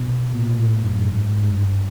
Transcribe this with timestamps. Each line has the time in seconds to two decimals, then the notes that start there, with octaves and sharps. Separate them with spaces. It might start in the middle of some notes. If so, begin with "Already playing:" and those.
Already playing: B2
0.33 A#2
0.58 A2
0.83 F#2
1.07 G#2
1.44 G2